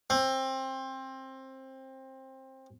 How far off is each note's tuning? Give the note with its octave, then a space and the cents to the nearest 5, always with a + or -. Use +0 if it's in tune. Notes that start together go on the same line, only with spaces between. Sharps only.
C4 +20